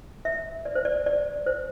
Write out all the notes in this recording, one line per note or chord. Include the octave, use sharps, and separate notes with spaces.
E5
D5
C5
D5
D5
C5